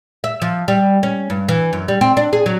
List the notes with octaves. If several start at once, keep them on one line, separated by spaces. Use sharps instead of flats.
E5
F3
G3
C#4
G2
E3
F#2
G3
C4
D4
G#4
F#3